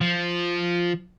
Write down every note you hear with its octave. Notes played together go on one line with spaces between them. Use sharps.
F3